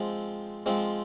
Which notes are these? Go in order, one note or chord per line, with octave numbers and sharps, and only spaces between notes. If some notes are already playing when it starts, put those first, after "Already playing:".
Already playing: F3 G#3 C4
F3 G#3 C4